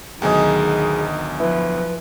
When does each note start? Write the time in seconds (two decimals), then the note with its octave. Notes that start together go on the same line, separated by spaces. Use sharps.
0.22 D2 B2 D#3 F#3 G#4 D#5 G#5 A#5
1.40 F3 E4 B4